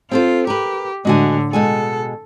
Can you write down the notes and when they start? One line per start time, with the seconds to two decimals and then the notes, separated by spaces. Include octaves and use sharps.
0.11 C4 F4 A4 C5
0.47 G4 A#4 B4
1.05 A2 D3 G#3 F#4 G#5
1.53 B2 G#3 A4 G#5